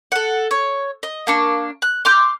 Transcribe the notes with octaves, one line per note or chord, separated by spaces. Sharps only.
A4 F#5
C#5
D#5
A#3 D4 C#6
F#6
C6 D6 F6 G6